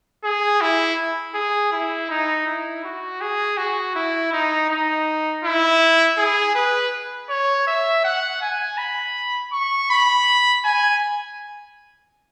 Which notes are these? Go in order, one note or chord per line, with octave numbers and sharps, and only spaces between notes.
G#4
E4
G#4
E4
D#4
E4
F#4
G#4
F#4
E4
D#4
D#4
E4
G#4
B4
C#5
E5
F#5
G#5
B5
C#6
B5
G#5